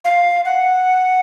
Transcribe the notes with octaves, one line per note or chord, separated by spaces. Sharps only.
F5
F#5